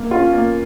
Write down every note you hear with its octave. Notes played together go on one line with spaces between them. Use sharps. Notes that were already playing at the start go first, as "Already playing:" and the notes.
Already playing: A#3
C#4 F4
A#3